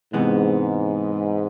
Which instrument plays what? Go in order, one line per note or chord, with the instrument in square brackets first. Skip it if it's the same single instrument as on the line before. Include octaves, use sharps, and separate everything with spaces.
[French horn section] G#2 [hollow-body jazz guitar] C3 E3 G#3 B3